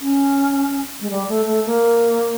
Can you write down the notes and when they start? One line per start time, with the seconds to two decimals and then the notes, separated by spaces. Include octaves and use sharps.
0.01 C#4
1.01 G#3
1.10 G3
1.29 A3
1.47 A3
1.65 A#3